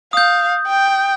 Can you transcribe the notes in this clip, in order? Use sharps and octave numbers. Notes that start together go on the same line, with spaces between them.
F5 D#6 G6
G5